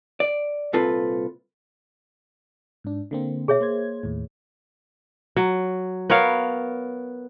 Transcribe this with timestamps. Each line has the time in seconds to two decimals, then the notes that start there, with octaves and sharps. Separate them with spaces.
0.20 D5
0.73 C2 A#2 C4 F4 A4 B4
2.84 G#2 D4
3.11 D3 A#3 C4
3.48 B2 G#4 C#5 E5
3.60 A#3 C5 G#6
4.03 D#2 A2
5.36 F#3
6.10 B3 A#4 C#5 F5